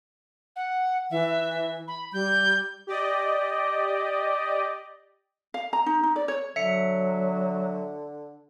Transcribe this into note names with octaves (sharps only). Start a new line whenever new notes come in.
F#5
E3 E5
B5
G3 G6
G4 D5 D#5
F5
A#5
D#4
D#4
D5
C#5
D3 F#3 E5 C#7